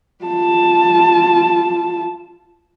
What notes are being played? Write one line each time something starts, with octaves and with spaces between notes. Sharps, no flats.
F4 A5